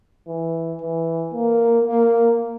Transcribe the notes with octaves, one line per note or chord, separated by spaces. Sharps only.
E3
E3
A#3
A#3